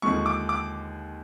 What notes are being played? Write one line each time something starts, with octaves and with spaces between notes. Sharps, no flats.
D#2 D3 F3 G#3 C#6
D6
D6